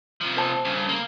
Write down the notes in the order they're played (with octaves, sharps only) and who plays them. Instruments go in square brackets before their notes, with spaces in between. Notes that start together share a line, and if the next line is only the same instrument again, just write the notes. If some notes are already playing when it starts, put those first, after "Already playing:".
[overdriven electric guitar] C3 F3
[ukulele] C5 A5
[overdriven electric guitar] G2 C#3
A#3